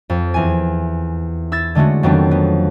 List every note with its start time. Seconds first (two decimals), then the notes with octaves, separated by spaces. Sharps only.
0.10 F2
0.34 E2 G#5
1.52 E4 E6 G#6 A6
1.75 D3 G#3 A3 C#4 F#4
2.03 F2 D#3 F#3 B3 C4 D4
2.31 B3